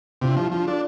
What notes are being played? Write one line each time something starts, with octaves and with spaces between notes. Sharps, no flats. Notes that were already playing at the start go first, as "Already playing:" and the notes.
C3 D4 F4
F3 E4 G4
F3 D4 F4
D4 F4 A4